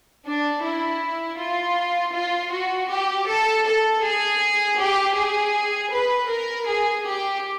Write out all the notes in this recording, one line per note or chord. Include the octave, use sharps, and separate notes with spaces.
D4
E4
F4
F4
F#4
G4
A4
A4
G#4
G4
G#4
B4
A#4
G#4
G4